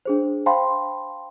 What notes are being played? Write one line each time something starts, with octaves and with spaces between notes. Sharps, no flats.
D4 G#4 C5
C5 F5 G5 A5 B5 C6